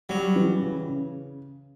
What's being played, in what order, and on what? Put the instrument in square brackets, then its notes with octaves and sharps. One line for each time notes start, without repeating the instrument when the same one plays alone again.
[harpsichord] F#3 [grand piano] G3
[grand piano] E3
C#3
C#3